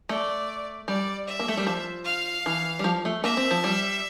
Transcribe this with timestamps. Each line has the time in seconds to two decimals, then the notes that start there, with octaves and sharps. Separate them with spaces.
0.09 A3 D5
0.88 G3 D5
1.27 E5
1.39 A#3
1.48 A3
1.57 G3
1.67 F3
2.05 F5
2.46 E3
2.79 G3
2.84 F3
3.05 A3
3.24 A#3 E5
3.37 C4
3.51 F3
3.64 G3